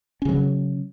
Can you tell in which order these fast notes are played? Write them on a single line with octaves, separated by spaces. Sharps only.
C#4 C#3 F#3